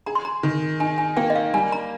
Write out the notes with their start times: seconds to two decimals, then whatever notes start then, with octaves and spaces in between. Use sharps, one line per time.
0.06 G#4 A#5
0.15 C6
0.25 A#5
0.43 D#3
0.80 D#4 G#5
0.98 G#5
1.17 A#3 G5
1.30 D#5
1.36 F5
1.54 G3 G#5
1.72 A#5